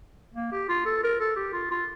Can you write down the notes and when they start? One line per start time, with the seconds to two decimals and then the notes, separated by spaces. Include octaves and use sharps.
0.35 A#3
0.52 G4
0.69 F4
0.85 A4
1.03 A#4
1.20 A4
1.36 G4
1.53 F4
1.71 F4